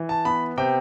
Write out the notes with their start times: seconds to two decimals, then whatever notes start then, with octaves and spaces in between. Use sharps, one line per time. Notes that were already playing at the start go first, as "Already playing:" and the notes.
Already playing: E3
0.09 A5
0.25 B3 B5
0.57 C3 G5